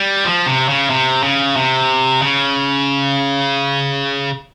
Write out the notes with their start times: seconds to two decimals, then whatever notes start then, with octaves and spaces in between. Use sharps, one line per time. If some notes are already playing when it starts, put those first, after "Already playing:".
Already playing: G3
0.24 F3
0.46 C3
0.69 C#3
0.90 C3
1.23 C#3
1.56 C3
2.22 C#3